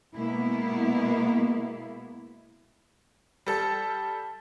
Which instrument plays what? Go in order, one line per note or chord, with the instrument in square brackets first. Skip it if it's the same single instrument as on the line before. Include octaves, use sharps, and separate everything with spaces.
[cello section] B2 G#3 A#3 B3 E4
[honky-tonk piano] G3 A4